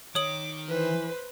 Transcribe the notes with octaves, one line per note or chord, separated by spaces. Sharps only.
D#3 C#5 D6 D#6 F#7
E3 B4 C5